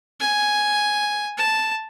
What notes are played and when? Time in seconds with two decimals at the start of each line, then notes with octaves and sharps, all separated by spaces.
0.20 G#5
1.38 A5